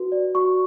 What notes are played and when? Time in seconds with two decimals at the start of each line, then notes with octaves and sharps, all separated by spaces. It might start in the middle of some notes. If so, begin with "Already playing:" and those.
Already playing: F#4 B4
0.12 D5
0.35 F#4 C#6